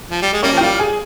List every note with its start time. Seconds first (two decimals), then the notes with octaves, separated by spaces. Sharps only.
0.11 F3
0.22 G3
0.33 G#3
0.43 G3 A#3 C#4 C#5
0.52 F3
0.58 G5
0.61 G3 F4 F5
0.79 G#4 G#5